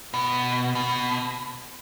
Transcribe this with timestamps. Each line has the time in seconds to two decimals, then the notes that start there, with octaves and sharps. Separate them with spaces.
0.14 B2
0.75 B2